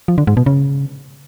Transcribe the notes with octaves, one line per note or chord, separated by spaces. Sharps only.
F3
D3
G#2
B2
C#3